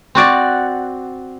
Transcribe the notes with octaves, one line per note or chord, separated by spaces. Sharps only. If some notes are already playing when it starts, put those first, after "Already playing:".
C4 F#4 D5 F#5